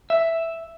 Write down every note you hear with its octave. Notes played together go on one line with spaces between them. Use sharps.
E5